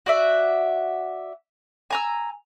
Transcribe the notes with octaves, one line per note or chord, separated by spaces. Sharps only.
F#4 D5 E5
G#5 A#5 E6